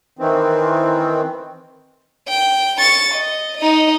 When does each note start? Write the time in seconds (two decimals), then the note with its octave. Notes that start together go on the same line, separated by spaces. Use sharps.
0.19 D#3 E3 C4
2.28 G5
2.78 C#6 A6
3.15 D#5
3.57 D#4 D#5